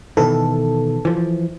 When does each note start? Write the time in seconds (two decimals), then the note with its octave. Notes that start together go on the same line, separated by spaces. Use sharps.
0.17 B2 D#3 E3 A4
1.05 E3 F3